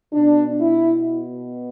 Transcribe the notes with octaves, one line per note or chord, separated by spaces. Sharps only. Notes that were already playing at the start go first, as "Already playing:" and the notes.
B2 D4
E4